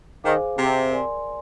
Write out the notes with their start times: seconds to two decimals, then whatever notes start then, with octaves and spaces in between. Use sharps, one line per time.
0.24 D#3 G#4 C5 F5 G#5 D6
0.57 C3
0.91 A#4 D5 G#5 C6